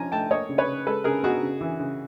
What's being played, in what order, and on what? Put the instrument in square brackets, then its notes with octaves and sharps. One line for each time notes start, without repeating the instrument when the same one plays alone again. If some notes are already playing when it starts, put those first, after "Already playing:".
Already playing: [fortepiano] F3 C#4 G#5 A#5
A3 G5 A5
A#3 C#5 D#5
C#3
B4 C#5
C#3
G#3 A4 B4
C#3 G#4 A#4
B3 F#4 G#4
C#3
E3
C#3